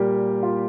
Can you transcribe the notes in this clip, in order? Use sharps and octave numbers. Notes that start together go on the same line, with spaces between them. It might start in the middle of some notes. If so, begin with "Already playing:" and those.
Already playing: A#2 G3 A#3 G4
F4